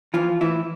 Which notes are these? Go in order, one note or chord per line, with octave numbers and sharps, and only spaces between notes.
E3 F3 F4
A2 E3 E4